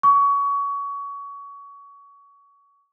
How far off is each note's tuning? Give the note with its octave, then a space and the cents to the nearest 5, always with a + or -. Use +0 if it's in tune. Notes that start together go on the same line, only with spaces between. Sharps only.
C#6 +25